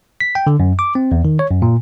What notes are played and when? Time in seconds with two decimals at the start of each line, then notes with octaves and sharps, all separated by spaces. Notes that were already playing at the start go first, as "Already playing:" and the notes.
0.21 B6
0.35 G5
0.47 D3
0.60 F#2
0.79 D6
0.95 C4
1.12 E2
1.25 D#3
1.39 C#5
1.51 F#2
1.62 A#2